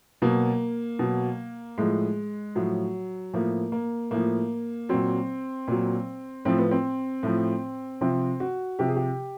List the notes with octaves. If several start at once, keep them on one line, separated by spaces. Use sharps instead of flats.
B2 F#3 A#3
B2 F#3
A2 F3 G#3
A2 F3 F#3
A2 F3 A#3
A#3
A2 F3 A#3
A#2 F#3 C4
A#2 F#3
A2 F3 C4
B3
C4
A2 F3
C3 F3 C4
F#4
C3 F3 G4
G#4
G4